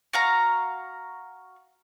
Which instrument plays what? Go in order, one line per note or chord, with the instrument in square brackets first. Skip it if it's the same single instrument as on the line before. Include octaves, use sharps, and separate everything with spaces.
[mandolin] F#4 F5 A#5